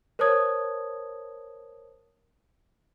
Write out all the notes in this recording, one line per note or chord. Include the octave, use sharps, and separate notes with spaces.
A#4 C5 C#5 A5 D#6 G#6